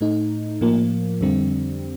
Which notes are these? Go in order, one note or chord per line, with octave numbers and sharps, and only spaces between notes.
A2 A3 D#4
A2 F3 A#3
F2 D3 G3 C4